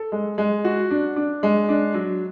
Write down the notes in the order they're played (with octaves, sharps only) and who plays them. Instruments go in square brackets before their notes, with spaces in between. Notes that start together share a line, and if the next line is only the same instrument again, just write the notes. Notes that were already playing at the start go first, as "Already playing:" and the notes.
Already playing: [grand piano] A4
G#3
G#3
F#4
D4
D4
G#3
D4
F#3